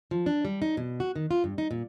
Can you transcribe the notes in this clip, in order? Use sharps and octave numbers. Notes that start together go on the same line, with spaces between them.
F3
D4
G3
D#4
B2
F#4
D#3
F4
G2
D#4
A#2